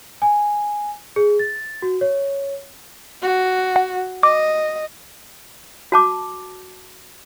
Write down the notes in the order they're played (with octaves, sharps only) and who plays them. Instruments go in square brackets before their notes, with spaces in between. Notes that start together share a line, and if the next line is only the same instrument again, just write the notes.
[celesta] G#5
G#4
A6
F#4
C#5
[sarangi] F#4
[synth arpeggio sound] F#5
[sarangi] D#5 [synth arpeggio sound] D6
[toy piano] F#4 A5 D6